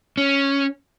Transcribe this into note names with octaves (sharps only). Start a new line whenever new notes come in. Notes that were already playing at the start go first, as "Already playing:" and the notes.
C#4